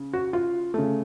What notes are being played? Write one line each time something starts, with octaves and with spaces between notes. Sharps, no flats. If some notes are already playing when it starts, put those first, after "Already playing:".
Already playing: C#3
F#4
F4
C#3 A3